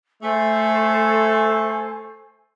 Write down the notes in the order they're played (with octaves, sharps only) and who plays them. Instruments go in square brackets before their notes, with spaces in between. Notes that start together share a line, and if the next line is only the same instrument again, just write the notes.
[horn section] A3 [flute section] A4 C5 G#5